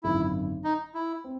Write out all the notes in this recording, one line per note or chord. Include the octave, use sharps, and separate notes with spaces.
G#1 F#2 D3 E4
D#4
E4
C4